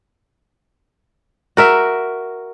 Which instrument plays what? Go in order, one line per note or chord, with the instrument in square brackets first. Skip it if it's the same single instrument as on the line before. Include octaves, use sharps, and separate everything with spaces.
[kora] F#4 A#4 E5